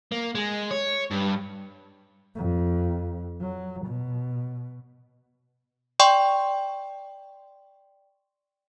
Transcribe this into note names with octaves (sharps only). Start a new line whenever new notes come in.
A#3
G#3
C#5
G2
F2
F#3
B2
D5 G5 C6 C#6